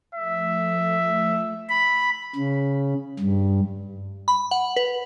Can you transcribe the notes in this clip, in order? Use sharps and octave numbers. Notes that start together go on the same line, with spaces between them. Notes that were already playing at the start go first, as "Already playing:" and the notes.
F3 A3 E5
B5
C#3
G2
B5
F#5
B4